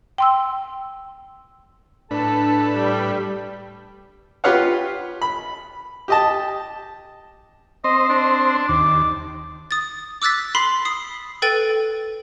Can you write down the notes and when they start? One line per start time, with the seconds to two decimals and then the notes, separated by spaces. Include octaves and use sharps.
0.18 G5 C6 E6
2.11 A2 D4 A4 B4 A5
2.76 G3
4.44 F4 G4 B4 C#5 F5 F#5
5.22 B5
6.08 G4 D#5 A5
7.84 C4 C5 D#5
8.09 D4
8.69 D#2 D6
9.71 D#6 A6
10.22 D6 E6 F#6 A6 B6
10.55 B5 C6 B6 C7
10.85 D#6 C7
11.42 A4 B4 G5 A6 D#7